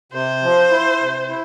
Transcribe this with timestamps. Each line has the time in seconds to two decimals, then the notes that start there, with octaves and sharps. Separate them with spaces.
0.12 C3 C5
0.42 F3
0.71 E4
1.00 C3
1.29 E4